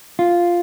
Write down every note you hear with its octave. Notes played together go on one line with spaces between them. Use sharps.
F4